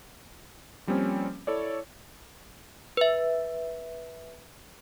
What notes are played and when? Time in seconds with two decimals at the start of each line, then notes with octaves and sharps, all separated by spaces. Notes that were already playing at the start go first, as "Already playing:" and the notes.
0.87 F3 G3 A#3 C4 C#4
1.47 E4 A4 C#5 D5
2.97 B4 E5